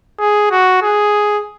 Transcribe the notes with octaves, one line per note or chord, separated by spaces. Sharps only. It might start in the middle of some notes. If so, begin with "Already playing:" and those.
G#4
F#4
G#4